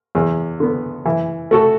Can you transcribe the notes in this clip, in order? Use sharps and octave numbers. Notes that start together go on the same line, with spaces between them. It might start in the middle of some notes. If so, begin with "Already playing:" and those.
E2
D3 B3
E3
A3 F#4 A4